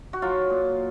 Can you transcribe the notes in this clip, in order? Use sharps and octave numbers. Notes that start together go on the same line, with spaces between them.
F#4
F#3 F4
A#2